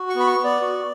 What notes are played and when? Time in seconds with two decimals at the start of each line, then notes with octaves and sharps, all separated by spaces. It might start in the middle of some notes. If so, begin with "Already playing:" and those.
Already playing: F#4
0.10 C#6
0.15 B3 B5
0.27 C#6
0.39 B3
0.44 D5
0.61 F#4